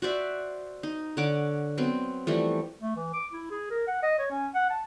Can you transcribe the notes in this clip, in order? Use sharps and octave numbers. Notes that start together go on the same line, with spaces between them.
F#4 C5 D5 E5
D#4
D3 C#5 F#5 D6
F#3 B3 C4
E3 F3 G3 A3
A3
E3
D6
E4
G#4
A#4
F#5
D#5
C#5
C#4
F#5
A5